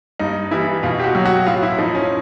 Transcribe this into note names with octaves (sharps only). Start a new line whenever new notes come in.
G2 D#4
E3 G3 E4
B2 F4
G4
F#4
F#3
F#4
A2 F4
E4
F3 D#4
C#4